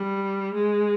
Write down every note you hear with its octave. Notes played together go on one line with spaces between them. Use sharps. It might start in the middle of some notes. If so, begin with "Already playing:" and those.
Already playing: G3
G#3